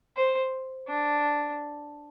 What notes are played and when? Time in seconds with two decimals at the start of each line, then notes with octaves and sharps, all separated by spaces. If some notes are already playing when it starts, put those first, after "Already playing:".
0.16 C5
0.88 D4